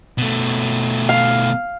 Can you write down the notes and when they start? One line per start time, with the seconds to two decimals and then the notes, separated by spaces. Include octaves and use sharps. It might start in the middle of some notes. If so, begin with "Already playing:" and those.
0.18 B2 A3
1.09 F5